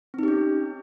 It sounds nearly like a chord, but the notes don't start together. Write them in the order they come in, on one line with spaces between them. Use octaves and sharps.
C4 D#4 G4 C#4